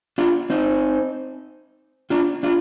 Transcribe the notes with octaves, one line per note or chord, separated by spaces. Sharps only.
D4 F4
C4 D#4
D4 F4
D4 F4